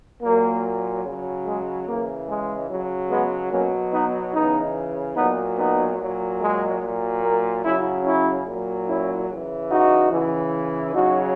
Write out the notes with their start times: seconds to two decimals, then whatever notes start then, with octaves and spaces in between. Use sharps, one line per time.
0.22 A#2 F#3 A#3
1.04 C#3 F#3
1.45 G#3
1.87 C#3 E3 A#3
2.28 G#3
2.69 C#3 F#3
3.10 G#3 B3
3.51 B2 F#3 A#3 C#4
3.92 B3 D#4
4.34 C#3 E3 B3 D#4
5.16 A#2 F#3 B3 D#4
5.58 B3 D#4
5.99 A#2 F#3
6.40 G#3
6.82 A#2 F#3
7.22 A#3
7.64 C#3 F#3 C#4 E4
8.05 C#4 E4
8.46 A#2 F#3
8.87 C#4 E4
9.29 C#3 E3
9.70 D#4 F#4
10.11 C#3 E3
10.93 C#3 F#3 D#4 F#4